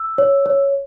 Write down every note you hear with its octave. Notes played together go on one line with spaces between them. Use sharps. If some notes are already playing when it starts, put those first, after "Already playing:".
Already playing: E6
C#5
C#5